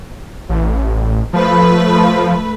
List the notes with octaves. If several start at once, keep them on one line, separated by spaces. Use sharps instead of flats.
A1
F3 A3 B4